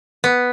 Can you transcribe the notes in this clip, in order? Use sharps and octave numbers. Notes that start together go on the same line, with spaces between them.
B3